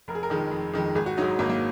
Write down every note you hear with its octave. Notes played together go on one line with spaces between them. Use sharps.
F1 A#4
G#4
A#4
F2 D#3 G#3
F1
F2 D#3 G#3
G#1 G#4
F#4
G#2 F#3 D#4
G#1 A#3
A#3